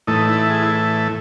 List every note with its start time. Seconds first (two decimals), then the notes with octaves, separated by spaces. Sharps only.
0.07 A2 E3 A3 D#4
0.29 E4
0.50 G#4
0.62 E4